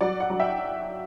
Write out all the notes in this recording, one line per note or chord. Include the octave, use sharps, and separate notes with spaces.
F#3 D5 F#5
D5 F#5
F#3
E5 G5